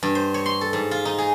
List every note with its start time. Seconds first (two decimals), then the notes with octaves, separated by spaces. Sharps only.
0.03 G2
0.15 C5
0.34 C#5
0.46 C6
0.61 A4
0.73 G#2
0.91 F4
1.05 D#4
1.18 G#4